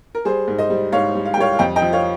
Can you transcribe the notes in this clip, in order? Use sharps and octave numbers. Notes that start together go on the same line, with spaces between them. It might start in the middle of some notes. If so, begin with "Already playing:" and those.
A#4
G3 G#4 C5
G#2
C5 D#5
G3
G#2 C#5 F5
G3
F5
G5
G3 C#5 F5
F5
F2 D#5 G5
D#5 G5
F3
C#5 F5